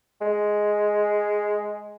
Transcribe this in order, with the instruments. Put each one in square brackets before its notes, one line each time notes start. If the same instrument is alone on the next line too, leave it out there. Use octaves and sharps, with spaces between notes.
[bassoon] G#3